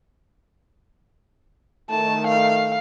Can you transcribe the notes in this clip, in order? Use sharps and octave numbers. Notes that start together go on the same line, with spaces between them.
D#3 A3 A5
F5